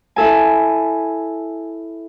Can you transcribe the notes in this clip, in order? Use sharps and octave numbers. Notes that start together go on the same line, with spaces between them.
E4 A4 G#5